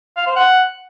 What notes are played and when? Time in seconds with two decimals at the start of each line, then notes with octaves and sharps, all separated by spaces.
0.17 F5
0.26 C5
0.36 F#5